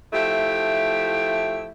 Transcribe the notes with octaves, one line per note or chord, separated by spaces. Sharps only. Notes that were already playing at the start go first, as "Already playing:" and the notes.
F3 A3 E4 G4